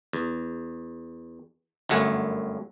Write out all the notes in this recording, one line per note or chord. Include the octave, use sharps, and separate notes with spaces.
E2
G1 F#2 A3 F#5 G#5